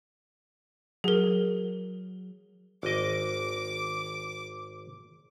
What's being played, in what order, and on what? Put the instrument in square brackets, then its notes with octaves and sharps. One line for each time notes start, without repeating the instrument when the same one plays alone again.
[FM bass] F#3 [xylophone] G#4 A#4
[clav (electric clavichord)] G#1 D#5 [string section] D6